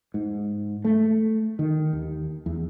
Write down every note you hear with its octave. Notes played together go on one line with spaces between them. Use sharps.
G#2
A3
D#3
D#2
E2